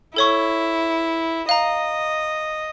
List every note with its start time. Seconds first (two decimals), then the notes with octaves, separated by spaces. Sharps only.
0.16 E4 A4 C#5 C#6
1.49 D#5 F5 A#5